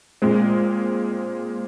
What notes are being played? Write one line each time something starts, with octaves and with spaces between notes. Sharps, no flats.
A#2 G#3 C4